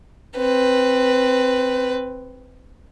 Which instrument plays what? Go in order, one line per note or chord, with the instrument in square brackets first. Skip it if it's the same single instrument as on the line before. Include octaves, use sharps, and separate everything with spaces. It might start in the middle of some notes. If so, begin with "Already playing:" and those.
[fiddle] C4 B4